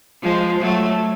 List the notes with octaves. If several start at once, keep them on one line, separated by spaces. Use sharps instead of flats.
F3 G#3
F#3 A3